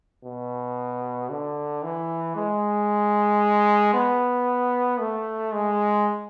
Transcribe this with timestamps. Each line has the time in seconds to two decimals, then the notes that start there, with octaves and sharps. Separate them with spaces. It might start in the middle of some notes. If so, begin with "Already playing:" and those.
0.24 B2
1.29 D3
1.83 E3
2.36 G#3
3.94 B3
5.00 A3
5.52 G#3